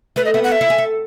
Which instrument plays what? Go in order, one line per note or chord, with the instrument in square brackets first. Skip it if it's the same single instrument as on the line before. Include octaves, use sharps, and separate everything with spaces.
[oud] A3 [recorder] B4
[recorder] D#5
[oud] B3 [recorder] E5
[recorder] F#5
E5
[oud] E4
G#4
A4